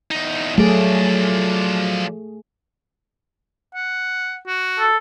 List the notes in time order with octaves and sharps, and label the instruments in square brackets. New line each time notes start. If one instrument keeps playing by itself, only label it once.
[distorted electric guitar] E2 D#4
[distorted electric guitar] F3 D5 [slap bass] F#3 [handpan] A3 G#4
[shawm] F#5
F#4
[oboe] A4